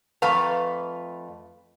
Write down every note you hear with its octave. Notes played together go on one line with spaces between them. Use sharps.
F2 A3 B4 F5 A#5